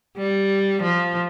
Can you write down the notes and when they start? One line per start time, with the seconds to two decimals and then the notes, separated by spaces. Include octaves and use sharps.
0.17 G3
0.82 F3